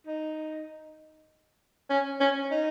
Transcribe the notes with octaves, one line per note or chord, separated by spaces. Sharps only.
D#4
C#4
C#4
D#4